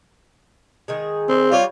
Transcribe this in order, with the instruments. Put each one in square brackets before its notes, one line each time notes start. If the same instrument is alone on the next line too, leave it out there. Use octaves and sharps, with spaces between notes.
[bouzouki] D#3 G#3 G#4
[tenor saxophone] C4
[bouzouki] G3 C#5 [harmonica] F4